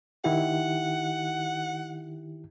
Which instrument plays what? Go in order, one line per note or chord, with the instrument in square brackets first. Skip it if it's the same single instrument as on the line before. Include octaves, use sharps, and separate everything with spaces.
[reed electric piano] D#3 E4 G4 [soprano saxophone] F#5